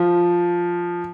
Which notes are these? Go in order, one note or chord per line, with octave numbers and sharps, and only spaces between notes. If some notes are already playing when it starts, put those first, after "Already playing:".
Already playing: F3